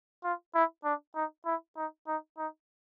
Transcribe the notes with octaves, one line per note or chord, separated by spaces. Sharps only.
F4
E4
D4
D#4
E4
D#4
D#4
D#4